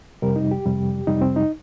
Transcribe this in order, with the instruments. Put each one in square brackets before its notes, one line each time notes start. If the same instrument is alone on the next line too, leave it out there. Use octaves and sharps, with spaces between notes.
[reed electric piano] F2 C3 G3 A#4
D#4
G4
F2 C3 G3
F2 C3 G3 D#4
C4
D#4